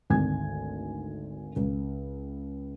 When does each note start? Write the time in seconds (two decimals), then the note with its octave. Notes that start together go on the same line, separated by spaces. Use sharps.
0.10 G#1 D2 G#5 G#6
1.56 C#2